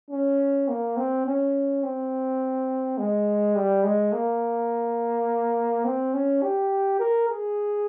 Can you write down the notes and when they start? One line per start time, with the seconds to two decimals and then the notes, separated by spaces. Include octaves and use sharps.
0.10 C#4
0.68 A#3
0.97 C4
1.25 C#4
1.83 C4
2.98 G#3
3.56 G3
3.84 G#3
4.13 A#3
5.85 C4
6.14 C#4
6.42 G4
6.99 A#4
7.29 G#4